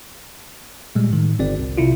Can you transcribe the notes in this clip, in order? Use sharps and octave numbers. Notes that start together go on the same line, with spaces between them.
A#2 G3 G#3
A2 D#3
G1 C4 D5
C2
B1 C3 E4 F4